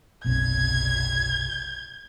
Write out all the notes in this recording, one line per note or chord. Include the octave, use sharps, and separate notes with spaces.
F#1 B1 C3 G#6